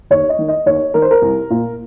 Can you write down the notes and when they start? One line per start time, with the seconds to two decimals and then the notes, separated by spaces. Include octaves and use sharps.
0.11 D#2 C#5
0.29 D#5
0.39 D#3
0.48 D#5
0.66 D#2 C#5
0.94 D#3 A#4
1.02 C5
1.11 A#4
1.22 C2
1.50 A#2